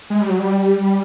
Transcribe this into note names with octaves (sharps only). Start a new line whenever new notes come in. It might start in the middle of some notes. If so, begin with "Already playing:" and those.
G#3
G3
F#3
G3